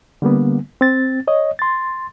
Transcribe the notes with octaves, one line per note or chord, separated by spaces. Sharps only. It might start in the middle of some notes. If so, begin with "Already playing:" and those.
D3 G3 A#3 B3
C4 A6
C#5 D#5
C6 A6